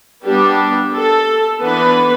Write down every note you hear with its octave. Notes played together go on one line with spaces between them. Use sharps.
G3 B3 D4 G4
A4
E3 B3 D4 B4